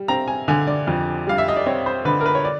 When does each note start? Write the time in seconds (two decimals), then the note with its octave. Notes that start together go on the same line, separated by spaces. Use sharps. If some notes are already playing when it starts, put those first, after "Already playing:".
Already playing: G3
0.08 C4 A#5
0.28 G#5
0.48 D3 G#5
0.67 D5
0.87 F2
1.27 G3 F5
1.38 E5
1.48 D#5
1.57 D5
1.66 C4 C#5
1.86 C5
2.05 D3 B4
2.21 A#4
2.26 B4
2.35 C#5
2.45 D5